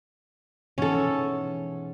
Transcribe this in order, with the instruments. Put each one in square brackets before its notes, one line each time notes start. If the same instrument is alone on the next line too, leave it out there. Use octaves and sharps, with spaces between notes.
[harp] G#2 B2 E3 [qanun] C#4 A4